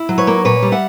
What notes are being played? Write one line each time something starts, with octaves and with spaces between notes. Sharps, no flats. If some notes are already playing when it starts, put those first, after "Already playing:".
Already playing: E4
F#3
B4 C#5
A#3
A#2 B4 C#5
G3
E5 F#5